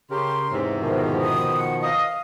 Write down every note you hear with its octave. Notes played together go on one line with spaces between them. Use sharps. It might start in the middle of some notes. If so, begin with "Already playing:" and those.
C#3 G4 A#4 C6
E2 G#2 C3
B2 D#3 F3 A#4
D#6
F#5
D#5 F5